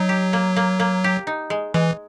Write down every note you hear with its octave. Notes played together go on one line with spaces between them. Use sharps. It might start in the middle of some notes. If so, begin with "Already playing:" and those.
Already playing: F#3 D#4
G4
A#3
A#3
A#3
G4
D#4
G#3
E3 G#3